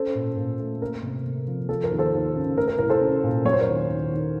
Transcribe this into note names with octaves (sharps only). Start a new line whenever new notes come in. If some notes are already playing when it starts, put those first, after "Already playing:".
Already playing: C#4 A4 C5
A#2
A#2
A3
A#3 A#4
C3
C3
F3
F3 A4
A#4
D#2
A4 C5
D#2
C#3
A3 A#4
A#4
C2 A#4
A4 C5
C#4
A#2
F#3 C#5
C5
A#4 C#5
D#2
D#2
D#3